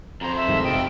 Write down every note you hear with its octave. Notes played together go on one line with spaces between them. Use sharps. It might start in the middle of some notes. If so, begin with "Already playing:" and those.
F2 C5 A#5
E5
G2 D#3 G#3
F1 C3 F4 D#5 G5